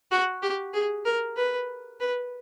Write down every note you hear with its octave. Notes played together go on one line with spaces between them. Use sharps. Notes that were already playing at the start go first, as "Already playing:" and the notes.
F#4
G4
G#4
A#4
B4
B4